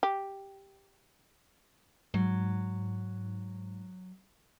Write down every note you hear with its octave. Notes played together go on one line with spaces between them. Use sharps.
G4
G#2 F#3